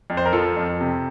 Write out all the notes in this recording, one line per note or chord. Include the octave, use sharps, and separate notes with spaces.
F2
C5
A#4
F3 A4
F2
C3